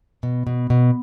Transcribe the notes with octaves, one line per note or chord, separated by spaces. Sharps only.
B2
B2
B2